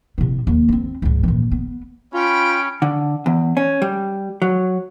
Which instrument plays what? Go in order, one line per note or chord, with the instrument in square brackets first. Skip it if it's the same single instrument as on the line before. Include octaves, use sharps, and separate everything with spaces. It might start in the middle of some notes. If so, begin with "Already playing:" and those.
[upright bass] C3 E4
D#2
B3 C4
C#2 G#2
D#1 E3
B3
[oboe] C#4 [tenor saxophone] F4 [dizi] G5 [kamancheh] B5
[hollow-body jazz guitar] D3
E2
C#4
G3
F#3